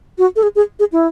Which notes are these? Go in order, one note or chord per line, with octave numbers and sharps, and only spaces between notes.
F#4
A4
G#4
G#4
G#4
E4